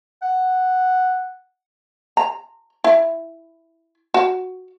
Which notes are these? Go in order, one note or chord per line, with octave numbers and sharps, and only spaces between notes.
F#5
A#5
E4
F#4